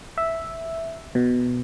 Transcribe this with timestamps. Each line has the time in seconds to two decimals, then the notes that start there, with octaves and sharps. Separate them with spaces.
0.18 E5
1.15 B2